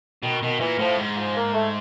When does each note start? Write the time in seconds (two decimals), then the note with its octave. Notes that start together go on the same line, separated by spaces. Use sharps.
0.23 B2 D#3
0.42 B2 D#3
0.60 A#2 E3
0.79 A2 F3
0.97 G#2
1.17 F3
1.36 A#3
1.53 A3